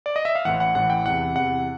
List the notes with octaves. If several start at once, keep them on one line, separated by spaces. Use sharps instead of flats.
D5
D#5
E5
F5
A1 A2 E3 F#5
F#5
A1 A2 E3 F#5
G5
E2 C3 E3 F#5
E2 C3 E3 F#5